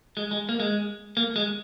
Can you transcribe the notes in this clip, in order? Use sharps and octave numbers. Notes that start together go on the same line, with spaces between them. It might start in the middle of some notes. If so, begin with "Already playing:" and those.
G#3
G#3
A#3
G#3
A#3
G#3